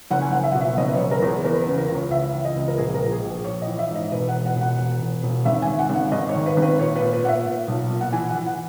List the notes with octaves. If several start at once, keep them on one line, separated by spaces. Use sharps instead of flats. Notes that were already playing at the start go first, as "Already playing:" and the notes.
F#1 F#5
G#5
F#1 F#5
E5
B2 F#5
E5
F#1 D#5
B4
C#5
F#1
A#4
E2
G#4
E3 A#4
B4
C#3
A#4
C#2
C#5
C#2 E5
E3
D#5
C#2
A#4
A#1 G#4
A#4
A#1
G#4
A#1
A#1 C#5
D#5
E3
E5
G#2 D#5
E1 B4
F#5
E1
F#5
E1
F#5
E1
E1
E1
G#1 E5
G#5
G#1
F#5
G#1
F#5
G#1 D#5
C#5
D#3
B4
G#1 B4
A#2 C#5
B4
A#2
B4
A#2 E5 F#5
A#2
B1
A#2
F#5
E3 G#5
F#5
E3
F#5